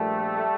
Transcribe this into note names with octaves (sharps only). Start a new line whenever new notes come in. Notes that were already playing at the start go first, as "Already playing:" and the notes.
Already playing: A#1 A#2 F3 G3 A3